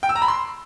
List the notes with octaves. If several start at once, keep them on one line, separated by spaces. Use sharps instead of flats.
G5
E6
A#5
B5
C6